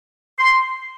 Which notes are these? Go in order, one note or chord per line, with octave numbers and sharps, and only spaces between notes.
C6